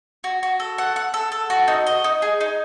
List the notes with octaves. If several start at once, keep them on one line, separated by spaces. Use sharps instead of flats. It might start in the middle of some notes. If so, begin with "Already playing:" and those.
F#4
F#4
A4
F#5
F#5
A4
A4
F#4
D#4
D#5
D#4
G#4
D#4